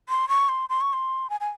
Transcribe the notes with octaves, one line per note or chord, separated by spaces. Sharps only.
C6
C#6
C6
C6
C#6
C6
G#5
G#5